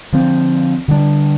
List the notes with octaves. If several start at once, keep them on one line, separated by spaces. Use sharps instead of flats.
D3 F3 C4
D3 G3 D4